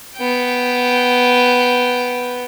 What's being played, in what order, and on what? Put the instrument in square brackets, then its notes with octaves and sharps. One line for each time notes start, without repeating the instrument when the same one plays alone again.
[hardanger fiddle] B3 G5